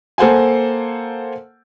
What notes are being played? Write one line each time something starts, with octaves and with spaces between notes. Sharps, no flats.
A#3 A4 C5 F#5 G#5